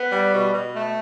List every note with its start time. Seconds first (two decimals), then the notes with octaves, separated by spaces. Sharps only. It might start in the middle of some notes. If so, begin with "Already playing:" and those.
Already playing: B3
0.11 G3
0.32 B2
0.54 B2
0.74 A3